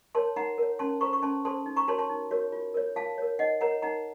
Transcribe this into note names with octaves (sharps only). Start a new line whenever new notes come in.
A#4 C#5 A5 C6
D#4 F#5 A#5
A#4 C#5
C#4 A5 C6
A4 C5 A#5 C#6
C#6
C#4 A5 C6
A4 C5 A5 C6
D#4
A#5 C#6
F#4 A#4 C#5 A5 C6
A5 C6
D#4
F#4 A#4 C#5
F4
A#4 C#5
F4 F5 A5
A#4 C#5
D#4 D#5 F#5
A#4 C#5 F#5 A#5
D#4 F#5 A#5